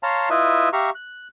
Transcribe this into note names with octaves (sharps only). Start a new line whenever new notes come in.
C#5 F5 A5 A#5 C6
E4 F4 B4 D#5 E5
G4 E5 F5 A#5 C#6
F#6